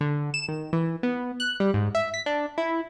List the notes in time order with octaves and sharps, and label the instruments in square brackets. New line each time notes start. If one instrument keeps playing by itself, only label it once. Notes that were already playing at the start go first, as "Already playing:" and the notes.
[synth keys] D3
E7
D#3
E3
B3
F#6
G3
G#2
E5
B6
D4
E4